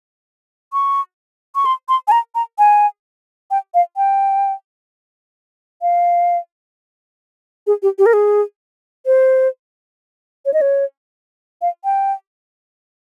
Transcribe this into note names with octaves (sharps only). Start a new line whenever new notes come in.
C#6
C#6
C6
C6
G#5
A#5
A#5
G#5
G5
F5
G5
F5
G#4
G4
G4
A#4
G#4
C5
C#5
D#5
C#5
F5
G5